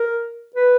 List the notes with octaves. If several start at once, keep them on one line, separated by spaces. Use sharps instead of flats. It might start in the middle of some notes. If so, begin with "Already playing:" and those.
Already playing: A#4
B4